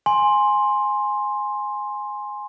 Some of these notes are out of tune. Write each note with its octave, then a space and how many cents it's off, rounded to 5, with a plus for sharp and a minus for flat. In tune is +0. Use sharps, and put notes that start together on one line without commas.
G#5 +0 C6 +10